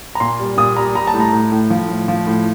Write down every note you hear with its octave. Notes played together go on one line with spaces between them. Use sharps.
A#5
A#2 C6
G3
A#2 D#6
G3 A#5
G3 A#5
A5
A2
A#5
A2
A2
F3
A2
F3
A2